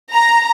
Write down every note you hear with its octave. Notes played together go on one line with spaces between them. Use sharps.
A#5